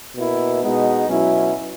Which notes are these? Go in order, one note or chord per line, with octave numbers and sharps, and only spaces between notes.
B2 A#3 E4
B2 G#3 B3 D#4
B2 F#3 C#4 E4